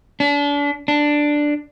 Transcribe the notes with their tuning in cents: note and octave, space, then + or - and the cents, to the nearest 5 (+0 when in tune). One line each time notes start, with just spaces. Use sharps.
D4 -35
D4 +5